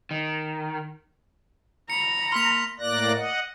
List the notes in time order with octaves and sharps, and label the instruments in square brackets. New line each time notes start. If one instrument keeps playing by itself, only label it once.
[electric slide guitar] D#3
[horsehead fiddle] A#5 B5 [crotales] C#7
[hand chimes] A#3 C6 [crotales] F6 B6 F7
[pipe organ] A2 A#3 D5 F#6 A#6
D#5 F#5